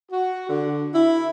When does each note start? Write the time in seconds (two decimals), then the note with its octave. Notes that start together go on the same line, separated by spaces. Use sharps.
0.12 F#4
0.49 D3
0.94 E4